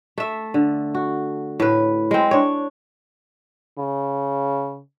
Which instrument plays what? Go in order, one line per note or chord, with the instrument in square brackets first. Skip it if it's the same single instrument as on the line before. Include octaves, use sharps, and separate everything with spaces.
[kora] A3 E5
D3
F#4
A2 B4
G#3 C4
D4 C#5
[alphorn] C#3